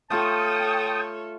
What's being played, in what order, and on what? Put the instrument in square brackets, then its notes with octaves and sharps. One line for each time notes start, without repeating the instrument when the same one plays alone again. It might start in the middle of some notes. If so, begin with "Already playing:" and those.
[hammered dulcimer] A3 F4 [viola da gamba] A4 C#5 [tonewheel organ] G5 D#6 [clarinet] A5